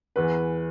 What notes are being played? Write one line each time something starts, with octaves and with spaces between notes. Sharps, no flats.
E2 E3 B4